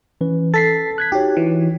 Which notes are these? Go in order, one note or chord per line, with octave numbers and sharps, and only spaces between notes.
E3 C#4 B4
A4 A6 B6 C7
F#6 G#6 B6
D#4 F#4 G4 C#5
E3